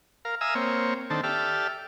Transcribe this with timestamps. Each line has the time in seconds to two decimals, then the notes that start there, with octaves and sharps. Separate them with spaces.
0.25 A#4 F5
0.41 E5 F5 G#5 A#5 D#6 E6
0.55 A#3 C4 C#5
1.10 D#3 C4 D4 A4
1.24 G4 A4 D5 E5 F6